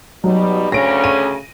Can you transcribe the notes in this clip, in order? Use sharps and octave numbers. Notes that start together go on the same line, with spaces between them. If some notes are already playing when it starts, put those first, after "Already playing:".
B2 F#3 G3 D#4
D2 C#3 C#4 A#6 D7
D#7